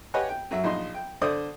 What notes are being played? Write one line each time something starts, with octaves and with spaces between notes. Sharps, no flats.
G4 B4 C#5 D#5 F#5 G#5
G5
F#2 F#3 E5
A#1 D#4 C6
G5
D3 C5 D5 D#6